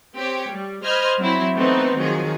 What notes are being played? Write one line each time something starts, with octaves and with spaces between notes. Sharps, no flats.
C4 G4 C#5
G3
C5 D#5 B5 F6 G#6
F#3 C4 E4
E3 A3 B3 C4 D#4
D#3 F3 F#3 G#4